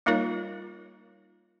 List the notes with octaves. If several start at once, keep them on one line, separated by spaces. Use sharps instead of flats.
G3 A#3 D#4 F4 A#4 C#5